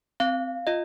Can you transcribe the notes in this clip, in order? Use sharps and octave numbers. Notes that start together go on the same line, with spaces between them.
C4 F5
F4 D#5